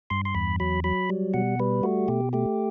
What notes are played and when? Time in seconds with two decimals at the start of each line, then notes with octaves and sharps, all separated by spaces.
0.10 G2 C6
0.25 C6
0.35 E2 B5
0.60 F#3 B5
0.84 F#3 B5
1.10 G3
1.34 B2 F#5
1.60 G3 B4
1.83 A3 F#4
2.08 B2 G4
2.33 A3 G4